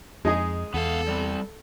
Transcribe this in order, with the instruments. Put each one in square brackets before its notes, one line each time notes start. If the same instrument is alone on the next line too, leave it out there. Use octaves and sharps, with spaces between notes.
[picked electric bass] F2 [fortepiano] G#3 D#4 G#4
[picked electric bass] E2 [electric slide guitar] B3 F5 [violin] A4
[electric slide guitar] G3 C4